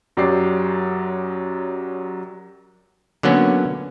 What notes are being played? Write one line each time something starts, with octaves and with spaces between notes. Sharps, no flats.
F#2 F#3 G4 D5 C7
D3 F#3 A#3 B3 C#4